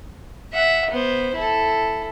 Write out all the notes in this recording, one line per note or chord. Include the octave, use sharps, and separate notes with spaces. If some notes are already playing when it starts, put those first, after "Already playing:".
E5 F#5
B3 C5
E4 A4